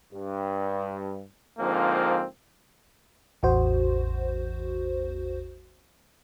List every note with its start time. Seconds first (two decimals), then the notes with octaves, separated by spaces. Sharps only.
0.12 G2
1.59 G#2 D3 F3 A#3 C4 F4
3.43 A1 E2 F#4 C5